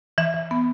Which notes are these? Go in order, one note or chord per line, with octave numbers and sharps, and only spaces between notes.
E3 E5
E3
B3